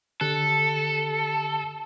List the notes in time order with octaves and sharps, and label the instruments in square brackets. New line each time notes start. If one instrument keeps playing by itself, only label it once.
[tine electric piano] D3 G4 F#6 [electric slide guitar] A4